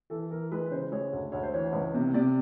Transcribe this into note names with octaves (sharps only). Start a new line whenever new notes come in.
E3 A4
E3 A#4
G#3 B4
C#3 C5
G#3 C#5
D2
D2 C#5
C5
E3 C#5
C#2
C3
C3 D5